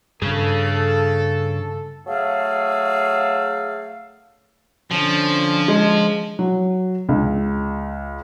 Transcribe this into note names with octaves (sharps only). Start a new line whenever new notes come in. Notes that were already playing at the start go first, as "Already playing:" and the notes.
G2 C#3 C#4 G#4 A4
F#3 A3 G#4 A4 F5
D3 F3 C#4
G#3
F#3
C#2